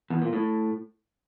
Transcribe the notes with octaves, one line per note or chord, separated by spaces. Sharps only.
E2
A#2
A2